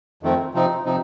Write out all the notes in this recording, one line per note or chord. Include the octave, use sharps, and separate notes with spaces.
F2 D#3 A3 C4
C3 F3 C4 D#4
C3 F3 C4 D#4